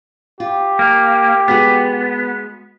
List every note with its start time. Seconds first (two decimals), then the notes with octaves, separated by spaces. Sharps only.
0.40 F4 G4
0.79 A#3
1.48 G#3 B3 F#4 G#4